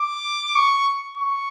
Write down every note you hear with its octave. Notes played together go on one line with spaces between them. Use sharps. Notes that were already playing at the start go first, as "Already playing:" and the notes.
Already playing: D6
C#6
C#6